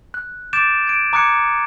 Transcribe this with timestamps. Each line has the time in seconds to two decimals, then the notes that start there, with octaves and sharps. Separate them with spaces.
0.14 F#6
0.53 D6 G6 A6 D7 E7
0.87 G#6 D7
1.13 A#5 D6 D#6 F#6 G#6 C#7